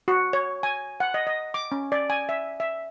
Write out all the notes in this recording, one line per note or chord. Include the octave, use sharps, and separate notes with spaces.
F#4
C#5
G#5
F#5
D#5
D#5
D6
C#4
D5
G#5
E5
E5